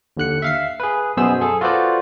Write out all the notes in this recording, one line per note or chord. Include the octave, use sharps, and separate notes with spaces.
D#2 D3 F#6 C#7
E5 F5 C7
G#4 B4
F#2 B2 B3 G#4 C5 E6
G#4 A4
F4 F#4 A4 B4 C5 D5